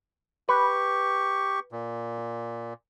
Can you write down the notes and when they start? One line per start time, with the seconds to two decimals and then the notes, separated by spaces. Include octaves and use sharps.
0.49 G4 B4 C#6
1.72 A#2